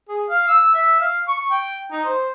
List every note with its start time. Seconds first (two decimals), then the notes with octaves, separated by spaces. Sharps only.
0.08 G#4
0.30 F5
0.48 E6
0.74 E5
1.01 F5
1.28 C#6
1.51 G5
1.92 D#4
2.05 C5